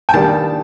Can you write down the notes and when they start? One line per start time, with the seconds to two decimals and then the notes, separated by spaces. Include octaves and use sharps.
0.09 G5
0.14 D#3 G3 A#3 D4 A5